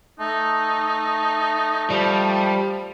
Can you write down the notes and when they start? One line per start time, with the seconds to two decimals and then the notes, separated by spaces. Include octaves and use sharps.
0.20 A3 D#4
1.91 F3 G3